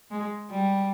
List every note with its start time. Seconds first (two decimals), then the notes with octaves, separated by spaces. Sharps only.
0.11 G#3
0.51 G3